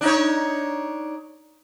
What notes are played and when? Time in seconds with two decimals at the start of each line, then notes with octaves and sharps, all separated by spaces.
0.01 D4 D#4 C#5